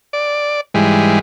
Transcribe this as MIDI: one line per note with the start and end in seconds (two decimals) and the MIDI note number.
0.13 0.61 74
0.74 1.19 44
0.74 1.19 52
0.74 1.19 55
0.74 1.19 56